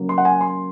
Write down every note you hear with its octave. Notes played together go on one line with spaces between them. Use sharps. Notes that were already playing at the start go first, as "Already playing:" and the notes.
Already playing: C#3 F#3 A#3
C6
F#5
G#5
C6